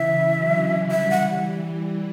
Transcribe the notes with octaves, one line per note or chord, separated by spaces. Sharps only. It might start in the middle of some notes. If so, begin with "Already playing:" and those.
Already playing: C#3 E3 E5
D3 F#3
E3 G3 E5
F#5